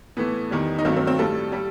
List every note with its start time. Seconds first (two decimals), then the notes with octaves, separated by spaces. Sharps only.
0.17 A2 E3 A3 B3
0.51 E2 D#3 G3
0.78 D#4
0.85 G2 D#3 F#3 A3 C4
0.96 C4
1.07 C4
1.18 A2 G3 A4
1.52 G3